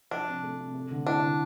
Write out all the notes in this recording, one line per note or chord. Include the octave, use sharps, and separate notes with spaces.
F3 D4
C3
A3
C3
A3
D3
D4 E4
D3